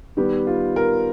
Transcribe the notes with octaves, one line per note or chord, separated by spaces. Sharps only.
D#3 G3 B3 G4
F4
A#4